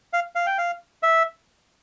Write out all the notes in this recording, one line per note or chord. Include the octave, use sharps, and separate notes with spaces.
F5
F5
G5
F5
E5